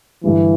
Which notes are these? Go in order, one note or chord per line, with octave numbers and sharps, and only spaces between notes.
G2 D3 E3 G3